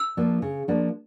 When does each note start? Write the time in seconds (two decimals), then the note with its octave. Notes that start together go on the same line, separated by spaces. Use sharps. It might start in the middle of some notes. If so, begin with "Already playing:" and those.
Already playing: E6
0.17 F3 A#3 D4
0.42 C#3
0.68 F3 A#3 D4